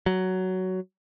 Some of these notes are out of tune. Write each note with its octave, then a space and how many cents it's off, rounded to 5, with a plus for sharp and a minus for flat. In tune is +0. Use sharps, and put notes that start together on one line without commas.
F#3 +10